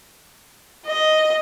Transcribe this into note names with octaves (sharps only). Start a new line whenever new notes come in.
D#5